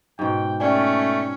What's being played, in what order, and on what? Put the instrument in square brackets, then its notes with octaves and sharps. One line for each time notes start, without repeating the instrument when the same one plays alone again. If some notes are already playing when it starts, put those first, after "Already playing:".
[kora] G#2 B2 [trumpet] G5
[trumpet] A3 [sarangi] C#4 [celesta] D5 G5 G#5